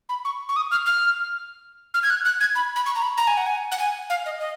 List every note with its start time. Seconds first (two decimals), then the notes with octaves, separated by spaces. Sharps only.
0.09 B5
0.25 C#6
0.49 C#6
0.56 D#6
0.71 F6
0.86 F6
1.94 F6
2.03 G#6
2.10 F#6
2.25 F#6
2.40 G#6
2.55 B5
2.76 B5
2.86 C#6
2.95 A#5
3.02 B5
3.17 A#5
3.27 G#5
3.37 F#5
3.46 G#5
3.71 F#5
3.79 G#5
4.10 F5
4.26 D#5
4.40 D#5